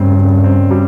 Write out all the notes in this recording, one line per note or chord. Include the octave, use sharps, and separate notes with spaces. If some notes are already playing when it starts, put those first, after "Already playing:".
Already playing: G2 C#3 C4
C#3
C4
G3